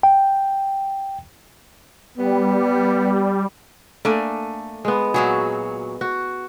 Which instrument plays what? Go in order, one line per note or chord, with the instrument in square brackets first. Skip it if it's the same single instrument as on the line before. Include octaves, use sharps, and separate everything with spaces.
[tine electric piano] G5
[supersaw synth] G3 [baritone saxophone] B3
[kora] A3 [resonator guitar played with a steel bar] A#3 D4 G#5
[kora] G#3 B3
[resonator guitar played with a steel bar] A#2 F#3 F#4 [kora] G#4
[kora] F#4